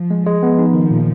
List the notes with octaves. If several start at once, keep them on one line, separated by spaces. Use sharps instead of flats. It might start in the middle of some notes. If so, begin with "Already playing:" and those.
Already playing: F3
G#3
G#3
F3 B3
D#4
D#3
A#2